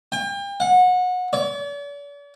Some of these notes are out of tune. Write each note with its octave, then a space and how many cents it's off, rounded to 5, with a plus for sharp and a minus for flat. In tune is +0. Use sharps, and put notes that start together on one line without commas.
G5 +35
F#5 -25
D5 -45